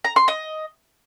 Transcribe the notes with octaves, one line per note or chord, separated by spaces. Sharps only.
A#5
C6
D#5